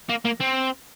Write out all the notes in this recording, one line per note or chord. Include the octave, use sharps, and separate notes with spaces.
A#3
A#3
C4